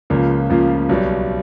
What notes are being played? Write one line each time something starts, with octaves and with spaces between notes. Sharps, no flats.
C#2 C#3 F3 A#3
C#2 C#3 F3 A#3
B1 B2 G3